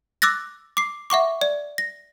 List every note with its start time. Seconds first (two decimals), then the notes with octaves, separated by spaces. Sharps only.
0.22 D6 E6 F#6 A6 A#6
0.77 D6 C7
1.10 E5 F#5 C#6 D6
1.41 D5
1.78 A#6